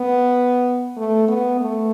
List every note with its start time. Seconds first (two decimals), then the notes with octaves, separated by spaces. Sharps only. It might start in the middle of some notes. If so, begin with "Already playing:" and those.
Already playing: B3
0.97 A3
1.28 B3
1.61 A3